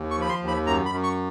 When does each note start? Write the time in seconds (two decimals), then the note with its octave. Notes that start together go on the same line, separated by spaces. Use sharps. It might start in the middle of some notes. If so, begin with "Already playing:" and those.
Already playing: D#2
0.11 C#6
0.18 F3 B5
0.29 C6
0.42 D#2
0.48 B5
0.66 F#2 A#5
0.86 B5
0.91 F#2
1.03 C#6